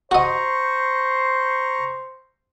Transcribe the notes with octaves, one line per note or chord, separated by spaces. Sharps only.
F#4 C5 D#5 A#5 C#6